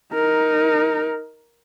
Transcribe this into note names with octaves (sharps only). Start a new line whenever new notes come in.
D#4 A#4